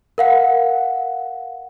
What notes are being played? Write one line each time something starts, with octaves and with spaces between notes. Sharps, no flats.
A#4 F5 F#5